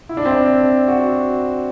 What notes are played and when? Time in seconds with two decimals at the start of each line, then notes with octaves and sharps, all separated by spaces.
0.09 E4
0.17 D4
0.25 C4
0.32 D4
0.88 F#4